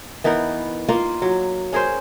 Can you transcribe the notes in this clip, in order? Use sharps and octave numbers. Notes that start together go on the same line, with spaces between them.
E3 B3 D#4 A#4
A#3 F4 A#4
F#3
C#4 G#4 A#4 C5